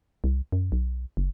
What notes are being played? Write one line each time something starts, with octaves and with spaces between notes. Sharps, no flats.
C2
F#2
B1
F#1